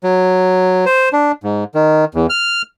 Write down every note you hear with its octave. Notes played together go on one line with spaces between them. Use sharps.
F#3
C5
D4
G#2
D#3
E2
F6